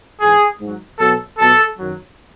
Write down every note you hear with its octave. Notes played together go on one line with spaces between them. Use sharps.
G#2 E3 G#4
G#2 F#3
B2 F#3 A4
B2 F#3 A4
F#2 D#3 F#3